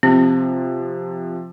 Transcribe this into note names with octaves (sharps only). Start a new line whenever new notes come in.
C3 F3 C4